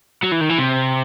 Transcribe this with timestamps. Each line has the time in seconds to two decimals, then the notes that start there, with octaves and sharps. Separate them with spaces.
0.23 F#3
0.31 E3
0.40 D#3
0.49 E3
0.58 C3